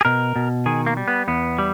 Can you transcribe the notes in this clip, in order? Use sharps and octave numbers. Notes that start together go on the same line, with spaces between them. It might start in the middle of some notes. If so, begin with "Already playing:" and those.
G#4
B2 A#4
B2
D#3 G#4
A#3
G3
B3
E2 B3
G3